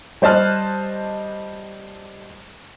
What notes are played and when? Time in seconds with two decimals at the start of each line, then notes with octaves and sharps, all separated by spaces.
0.22 G3 C5 D#5 A5 F6 F#6